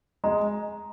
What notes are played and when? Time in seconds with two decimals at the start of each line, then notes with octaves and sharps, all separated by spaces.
0.24 G#3 A#5